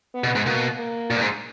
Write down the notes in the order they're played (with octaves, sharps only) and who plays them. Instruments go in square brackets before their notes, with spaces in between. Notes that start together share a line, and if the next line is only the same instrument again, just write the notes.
[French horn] B3
[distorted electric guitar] B2
G#2
[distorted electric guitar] B2 [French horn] A#3
[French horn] A#3
[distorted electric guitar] A#2
G2
G#2